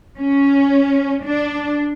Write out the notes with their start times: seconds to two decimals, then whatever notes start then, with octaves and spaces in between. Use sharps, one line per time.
0.18 C#4
1.24 D4